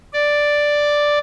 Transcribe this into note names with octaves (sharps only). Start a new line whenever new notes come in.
D5